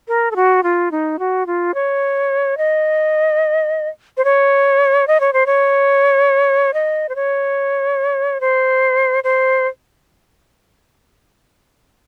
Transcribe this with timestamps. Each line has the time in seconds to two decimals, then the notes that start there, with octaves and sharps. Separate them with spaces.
0.08 A#4
0.31 A4
0.36 F#4
0.63 F4
0.91 D#4
1.19 F#4
1.47 F4
1.74 C#5
2.58 D#5
4.17 C5
4.25 C#5
5.07 D#5
5.20 C#5
5.33 C5
5.46 C#5
6.74 D#5
7.09 C5
7.16 C#5
8.41 C5
9.24 C5